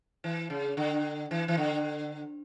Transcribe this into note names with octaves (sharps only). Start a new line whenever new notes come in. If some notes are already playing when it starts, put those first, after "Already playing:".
E3
C#3
D3
E3
E3
D3